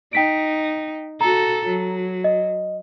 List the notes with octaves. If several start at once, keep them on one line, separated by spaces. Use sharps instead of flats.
D#4 G5 B6 D7
F#4 A4 A#5
F#3
D#5